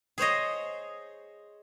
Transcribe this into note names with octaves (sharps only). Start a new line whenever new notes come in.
G#4 C5 C#5 D#5